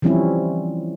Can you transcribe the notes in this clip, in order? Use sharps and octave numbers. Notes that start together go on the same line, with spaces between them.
E3 F3 G3 C4 C#4 E4